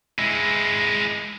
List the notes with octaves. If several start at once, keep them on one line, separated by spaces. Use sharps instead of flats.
G#3 E4